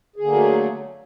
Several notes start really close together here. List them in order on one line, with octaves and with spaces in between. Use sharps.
G#4 D3 A#3 F#3 A3